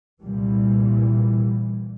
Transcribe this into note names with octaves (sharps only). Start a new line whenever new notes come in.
C2 A#2 E3 G3